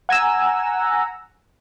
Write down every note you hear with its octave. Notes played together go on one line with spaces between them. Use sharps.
F#5 G#5 A#5 E6